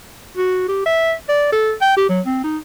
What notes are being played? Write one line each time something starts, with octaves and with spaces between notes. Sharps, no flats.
F#4
G4
E5
D5
A4
G5
G4
F#3
C4
D#4